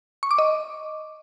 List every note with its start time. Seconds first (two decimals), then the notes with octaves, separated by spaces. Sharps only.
0.23 C#6
0.31 D6
0.38 D#5